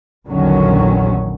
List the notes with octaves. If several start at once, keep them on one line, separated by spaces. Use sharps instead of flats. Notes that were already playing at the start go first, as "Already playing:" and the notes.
A#1 E2 D3 D#3 F#3 C#4